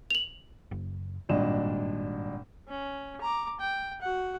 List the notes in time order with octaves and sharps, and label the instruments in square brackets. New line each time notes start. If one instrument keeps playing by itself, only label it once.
[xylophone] F7 F#7
[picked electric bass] F#1
[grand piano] G#1 G2 A#2 D4 D#5 E7
[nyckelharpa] C#4
A#5 D6
G5
F#4 F#5